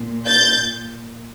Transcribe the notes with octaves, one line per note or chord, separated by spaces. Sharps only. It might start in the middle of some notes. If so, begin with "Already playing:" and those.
Already playing: A#2
G6 A6